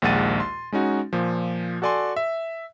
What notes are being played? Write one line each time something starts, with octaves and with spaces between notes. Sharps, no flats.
A#1 D#2 G#3 F#5 A6 D#7
C6
G#3 C#4 D#4 F#4
A#2 F3
F#4 A4 D5 G#5 C6
E5